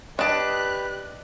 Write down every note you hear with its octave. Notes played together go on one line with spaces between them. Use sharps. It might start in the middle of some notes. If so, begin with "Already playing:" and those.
D4 G4 B4 D#5 A5 D#6 F#6 D7